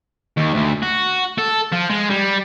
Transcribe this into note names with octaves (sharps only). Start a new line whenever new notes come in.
D#2
D2
F#4
A4
F3
G#3
G3